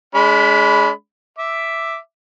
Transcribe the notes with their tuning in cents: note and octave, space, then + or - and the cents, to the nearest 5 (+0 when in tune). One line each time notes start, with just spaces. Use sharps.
G#3 +15 D4 -45 B5 +0
E5 +0 D6 +0